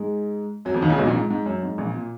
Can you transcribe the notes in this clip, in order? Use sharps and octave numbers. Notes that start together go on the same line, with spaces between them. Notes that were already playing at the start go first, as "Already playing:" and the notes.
Already playing: G#2 G#3
F#2 F#3
F2 F3
D#2 D#3
C#2 C#3
B1 B2
A#1 A#2
G#2
G#2
F#2
G#2
A#1 A#2
A#2